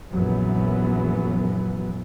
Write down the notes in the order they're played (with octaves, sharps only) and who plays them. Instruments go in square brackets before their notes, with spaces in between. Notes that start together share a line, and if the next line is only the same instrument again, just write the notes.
[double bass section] A#1 F#2 E3 F#3 B3